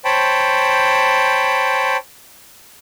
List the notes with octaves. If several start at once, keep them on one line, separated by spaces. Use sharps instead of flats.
C5 C#5 G5 A5 B5